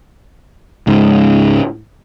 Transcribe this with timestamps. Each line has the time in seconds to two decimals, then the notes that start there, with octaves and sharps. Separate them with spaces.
0.87 C#2 G#2